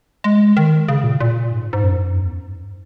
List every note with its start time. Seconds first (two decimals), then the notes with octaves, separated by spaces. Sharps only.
0.24 G#3
0.57 D#3
0.88 C#3
1.04 A#2
1.21 A#2
1.52 G#2
1.73 G#2
1.84 F#2
2.16 E2
2.31 F#2
2.46 G#2
2.57 F#2